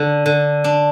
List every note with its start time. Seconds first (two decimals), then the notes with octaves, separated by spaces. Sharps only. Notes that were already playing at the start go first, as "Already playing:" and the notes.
Already playing: D3
0.26 D3
0.64 D4